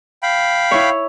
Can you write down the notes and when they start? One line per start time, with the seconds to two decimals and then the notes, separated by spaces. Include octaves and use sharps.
0.23 F5 G5 B5
0.71 E4 C#5